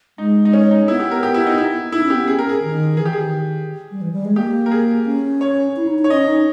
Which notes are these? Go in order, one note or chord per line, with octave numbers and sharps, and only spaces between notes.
G#3 D#4
D#4
C#4
D#4
B3 E4
G4
A#4
G4
E4
D#4
E4
D#4 E4
C#4
B3 G4
C#4 G#4
A#4
G#4
D#3
E3 G#4
G4
D#3 G#4
G3
E3
G3
G#3
A#3 G4
A#4
G#4
C#4
C#5
E4
D#4
D#4
C#5
C#4 D#5
D#4